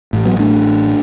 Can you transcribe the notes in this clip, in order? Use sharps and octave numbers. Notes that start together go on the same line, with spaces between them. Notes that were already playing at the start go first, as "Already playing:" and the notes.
A1 A2
F#3 B3
A3 D4